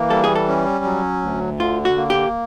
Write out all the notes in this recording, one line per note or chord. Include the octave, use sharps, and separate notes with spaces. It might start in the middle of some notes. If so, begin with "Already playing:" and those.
Already playing: E3 A#3
G3 A4
G#4
A4
C#4
F#3
D2
D3 F4
F#4
A#3
G4